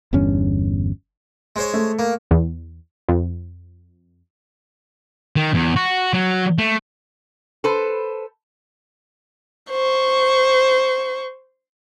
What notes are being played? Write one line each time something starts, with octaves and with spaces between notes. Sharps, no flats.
G1 E2 G2 C#4
G#3 C5 C#5
A3
A#3
E2
F2
D#3
E2
F#4
F#3
A3
A4 B4 C5
C5 C#6